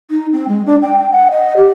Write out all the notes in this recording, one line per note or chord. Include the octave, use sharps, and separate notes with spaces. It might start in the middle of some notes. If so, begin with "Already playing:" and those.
D#4
C4
G#3
D4
G5
G5
F#5
D#5
G4